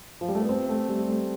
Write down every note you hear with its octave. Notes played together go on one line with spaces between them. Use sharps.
F3
G3
A3
B3
C4
A3
G3
A3